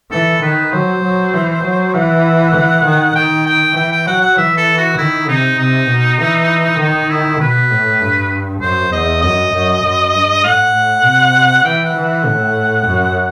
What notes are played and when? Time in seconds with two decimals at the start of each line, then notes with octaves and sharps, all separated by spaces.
0.11 E3 A4
0.42 D#3 B4
0.72 F#3 C5
1.03 F#3
1.33 E3
1.64 F#3
1.94 E3 F#5
2.55 E3
2.84 D#3
3.15 D#3 G5
3.46 G5
3.75 E3 G5
3.92 G5
4.06 F#3 F#5
4.21 F#5
4.36 E3 E5
4.57 A4
4.78 F#4
4.97 D#3 E4
5.28 C3 D#4
5.58 C3 D#4
5.89 B2
6.19 E3
6.79 D#3 D#4
7.09 E4
7.40 B2 B4
7.71 A2
8.00 G2
8.61 F#2 C5
8.92 E2 D#5
9.22 F#2 D#5
9.53 F#2
9.83 F#2
10.13 G2
10.44 A2 F#5
10.74 A2
11.05 C3
11.65 E3 G5
11.85 F#5
11.95 E3
12.06 F#5
12.25 A2
12.86 F#2